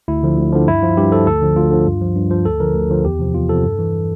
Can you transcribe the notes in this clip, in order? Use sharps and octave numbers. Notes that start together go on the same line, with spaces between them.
D2 E4
D3 F3
D2
D3 F3
G2 E4
F3 F4
G2 G4
F3 A4
D2 A4
D3 F3
D2 F4
D3 F3
G2
F3
G2
F3 C5
D2 A4
D3 F3 A#4
D2
D3 F3
E2 G4
C3 F3
E2 F4
C3 F3 A4
G2
E3